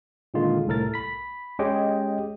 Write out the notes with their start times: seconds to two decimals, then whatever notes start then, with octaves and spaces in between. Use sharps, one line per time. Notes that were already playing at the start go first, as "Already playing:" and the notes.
0.34 A#2 D3 D#3 G#3 F4
0.67 C2 A2 A4 A#4 A6
0.94 B5 B6
1.59 G#3 C#4 G4 C#5 D#5 G5